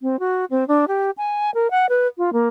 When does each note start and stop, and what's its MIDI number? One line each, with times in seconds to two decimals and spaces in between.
0.01 0.19 60
0.19 0.45 66
0.51 0.67 60
0.68 0.85 62
0.88 1.11 67
1.17 1.51 80
1.54 1.70 70
1.71 1.86 78
1.89 2.07 71
2.18 2.30 65
2.33 2.48 58